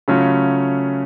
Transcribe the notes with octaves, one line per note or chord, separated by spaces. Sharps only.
C#3 F#3 A3 C#4 F4